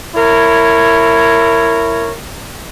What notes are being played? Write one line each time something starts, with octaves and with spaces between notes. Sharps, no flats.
E4 A#4 C#5